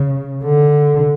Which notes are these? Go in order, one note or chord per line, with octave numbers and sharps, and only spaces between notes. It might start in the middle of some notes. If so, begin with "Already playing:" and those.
Already playing: C#3
D3